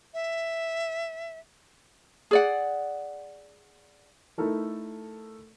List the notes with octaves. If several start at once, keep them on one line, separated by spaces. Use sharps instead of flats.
E5
G#4 D5 F#5
A3 D#4 E4 A4 A#4